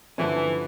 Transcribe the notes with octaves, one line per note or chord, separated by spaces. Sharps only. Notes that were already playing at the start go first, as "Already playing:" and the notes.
G2 D3 E3 F3 A3 C#4